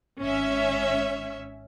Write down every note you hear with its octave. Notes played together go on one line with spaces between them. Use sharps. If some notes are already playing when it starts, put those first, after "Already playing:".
G#1 C#4 C#5 E5